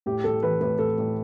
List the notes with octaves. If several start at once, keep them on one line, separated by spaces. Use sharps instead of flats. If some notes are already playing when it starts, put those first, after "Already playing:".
A2 G4
A2 A4
E3 B4
A2 B4
A2 A4
A2